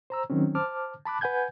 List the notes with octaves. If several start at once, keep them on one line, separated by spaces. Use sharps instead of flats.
C5 A#5 E6
D#3 F#3 C4 C#4
C5 A5 D6 F6
A5 B5 D6 F#6
B4 F#5 G#5 G6 G#6